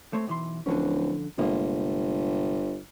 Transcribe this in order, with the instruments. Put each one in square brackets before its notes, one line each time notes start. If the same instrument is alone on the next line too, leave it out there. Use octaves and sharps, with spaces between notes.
[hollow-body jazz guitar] A3 C4 C#5
B1 E3 C6
[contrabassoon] D1 [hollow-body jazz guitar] D3 F3 C#4
[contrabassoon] G1 [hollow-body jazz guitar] C3 G#3 A#3